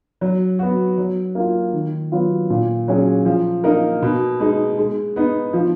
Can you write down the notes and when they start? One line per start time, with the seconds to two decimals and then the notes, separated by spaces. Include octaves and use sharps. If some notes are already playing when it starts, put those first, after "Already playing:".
0.21 F#3
0.59 B3 F#4
0.98 F#3
1.35 A#3 F4
1.73 D#3
2.12 F#3 B3 F4
2.50 A#2
2.88 F#3 C#4 G#4
3.25 F3
3.64 A#3 D#4 A#4
4.02 B2
4.40 G#3 D#4
4.78 G#3
5.16 B3 D#4
5.53 F3